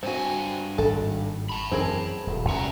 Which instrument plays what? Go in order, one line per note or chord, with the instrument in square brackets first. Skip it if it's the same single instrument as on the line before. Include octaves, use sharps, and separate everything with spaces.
[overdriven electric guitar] G2 G#5 [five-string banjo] C4 F#4
[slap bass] G#1 [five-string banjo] A4
[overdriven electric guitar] A5 B5
[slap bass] F#2 E3 [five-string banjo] C4 G#4 A#4
[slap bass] D#1
[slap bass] C2 [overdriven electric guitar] C#4 A#5